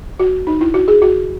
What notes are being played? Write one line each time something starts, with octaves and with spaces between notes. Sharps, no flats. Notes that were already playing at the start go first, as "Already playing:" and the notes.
F#4
D#4
E4
F#4
G#4
F#4